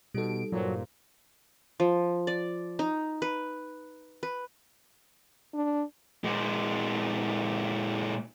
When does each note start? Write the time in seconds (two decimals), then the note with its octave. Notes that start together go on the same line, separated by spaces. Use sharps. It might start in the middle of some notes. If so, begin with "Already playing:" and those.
0.15 B2 G3 D#4 G4 A4 D7
0.52 G2 A#2 F#3 A#4 C5
1.80 F3
2.27 D5
2.79 D#4
3.22 B4
4.23 B4
5.54 D4
6.24 A#2 G#3